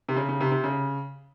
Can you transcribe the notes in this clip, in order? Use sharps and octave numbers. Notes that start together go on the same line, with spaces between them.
C3
C#3
C#3
C3
C3
C#3